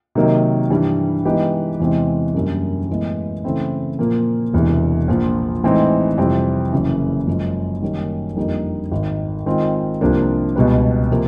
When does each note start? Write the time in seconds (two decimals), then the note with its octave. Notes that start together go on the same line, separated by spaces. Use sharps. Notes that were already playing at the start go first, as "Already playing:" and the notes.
0.15 C3 D#3 F#3 A#3 D#4
0.70 G2 E3 G3
1.25 E3 G#3 B3 D#4 G4
1.80 E2 C3 E3 G#3 C4
2.35 F#2 D3 G3 A#3 C#4
2.89 A2 E3 G#3 B3
3.44 C#3 E3 A3 C4 E4
3.99 A#2 F3 A#3
4.53 E1 E2 C3 E3
5.08 A#1 A#2 F3
5.63 A2 E3 G#3 C4 D#4
6.18 F2 C3 E3 G3 C4
6.73 F#1 F#2 C#3 E3
7.27 F#2 C#3 F3 G#3
7.82 F#2 D#3 G3 A#3 C#4
8.36 F2 D3 G3 A#3 D#4
8.91 G#1 G#2 D#3
9.46 D#3 G#3 C4 F4
10.01 C2 C3 F3 A#3 D4
10.56 C#2 B2 G3 B3
11.11 C3 F3 A#3